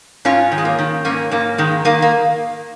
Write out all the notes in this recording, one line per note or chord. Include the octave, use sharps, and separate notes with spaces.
G#2 C#4 F4
D#3
G#3
A#3
D#3
G#2 A#3 C#4
G#2 A#3
D#3 G#3
D#3 A#3
A#3